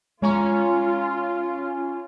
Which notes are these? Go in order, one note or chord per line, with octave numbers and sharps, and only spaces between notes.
G#3 C#4 F4 C#5 A#5 C#6